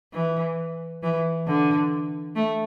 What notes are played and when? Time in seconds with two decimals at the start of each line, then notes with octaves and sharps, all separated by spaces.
0.13 E3
1.03 E3
1.47 D3
2.36 A3